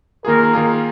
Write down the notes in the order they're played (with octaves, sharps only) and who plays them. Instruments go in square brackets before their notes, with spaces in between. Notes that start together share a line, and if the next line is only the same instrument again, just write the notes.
[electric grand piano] D#3 A#3 F4 G#4 [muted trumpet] A#4
[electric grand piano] D#3 A#3 F4 G#4